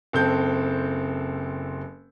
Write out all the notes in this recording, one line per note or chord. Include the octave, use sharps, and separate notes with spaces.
F#1 C4 A4 G6